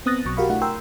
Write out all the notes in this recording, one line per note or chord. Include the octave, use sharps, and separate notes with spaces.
B3 C4 D#6 F#6 A6 A#6
B1 B2 F#3 C#6
F#4 G4 A#4 F5 B5 C#6
A3 D4 E4 F#5
A#4 G5 C6 E6